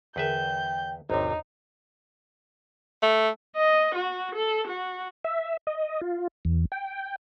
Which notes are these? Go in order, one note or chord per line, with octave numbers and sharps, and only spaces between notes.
E2 D3 G#4 A#4 B4 E5 G5 G6
G#1 E2 C3 D#4 C5 C#5
A3
D#5
F#4
A4
F#4
E5
D#5
F4
E2
G5